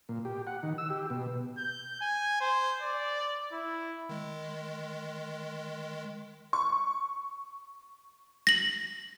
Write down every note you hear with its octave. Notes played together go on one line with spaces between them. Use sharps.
A#2
G4
F#5
D#3
E6
G4
B2
G6
G#5
C5
D5
E4
D#3 G#3
C#6
A#6 F#7